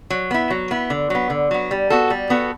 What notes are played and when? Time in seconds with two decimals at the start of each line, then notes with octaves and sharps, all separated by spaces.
0.10 F#3
0.31 B3 E4
0.50 F#3
0.71 B3 E4
0.90 D3
1.10 F#3 B3
1.30 D3
1.51 F#3 B3
1.71 G3
1.90 B3 F#4 A4
2.10 G3
2.30 B3 F#4 A4